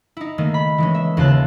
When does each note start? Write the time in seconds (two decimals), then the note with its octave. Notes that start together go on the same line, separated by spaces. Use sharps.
0.17 D#4 E4
0.38 D#3 A3 A#3
0.54 B5
0.78 E3 G#3 C#4
0.94 E5
1.17 D#2 C#3 F4 A5 F#6